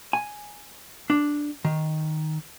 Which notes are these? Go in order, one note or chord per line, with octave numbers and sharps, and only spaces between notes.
G#5
D4
D#3